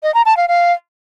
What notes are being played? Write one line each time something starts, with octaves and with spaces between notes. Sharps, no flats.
D#5
A#5
A5
F5
F5